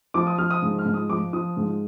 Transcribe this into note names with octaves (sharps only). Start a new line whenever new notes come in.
F3 D6
D#6
F3 F6
D#6
G#2
F6
G#2
D#6
F3 D6
F3 D#6
G#2